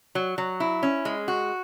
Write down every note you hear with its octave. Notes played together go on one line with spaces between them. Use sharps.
F#3
F#3
E4
C#4
G#3
F#4